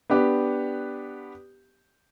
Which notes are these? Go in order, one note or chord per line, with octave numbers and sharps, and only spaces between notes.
B3 D4 G4 B4